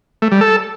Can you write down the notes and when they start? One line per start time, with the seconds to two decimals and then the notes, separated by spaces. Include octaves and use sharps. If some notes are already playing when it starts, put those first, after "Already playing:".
0.22 A3
0.32 G3
0.41 A4